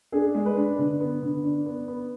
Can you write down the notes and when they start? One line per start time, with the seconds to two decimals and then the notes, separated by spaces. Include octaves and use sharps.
0.12 D4 G#4
0.35 G#3
0.46 B4
0.56 D4
0.78 D3
1.00 B3
1.22 D3
1.44 D4
1.66 B3
1.88 B3